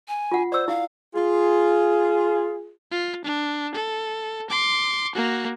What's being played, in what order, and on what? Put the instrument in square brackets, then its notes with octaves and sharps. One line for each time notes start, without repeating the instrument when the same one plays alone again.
[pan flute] G#5
[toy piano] F4 F#5
[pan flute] C5 [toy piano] D5 E6
[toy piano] E4 [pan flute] F5
[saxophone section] F4 G#4
[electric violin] F4
D4
A4
C6 D6
A#3 F#4